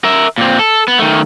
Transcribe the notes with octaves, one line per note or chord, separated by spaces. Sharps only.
A#4 E5
A#2 C4
A4
B3
D#3 A3